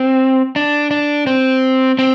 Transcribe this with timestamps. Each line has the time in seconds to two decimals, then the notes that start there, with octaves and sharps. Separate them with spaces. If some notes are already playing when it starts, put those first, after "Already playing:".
Already playing: C4
0.56 D4
0.91 D4
1.27 C4
1.99 C4